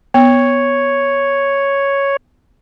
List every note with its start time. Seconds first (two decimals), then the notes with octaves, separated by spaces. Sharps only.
0.14 B3 C#5